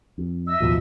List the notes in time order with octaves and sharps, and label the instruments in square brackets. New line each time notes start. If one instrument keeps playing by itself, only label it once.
[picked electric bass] F2
[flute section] D#5 E5 [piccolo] E6
[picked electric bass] A1 D#2 B2 [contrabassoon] F3